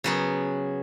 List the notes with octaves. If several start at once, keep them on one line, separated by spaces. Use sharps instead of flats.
C#3 F#3 B3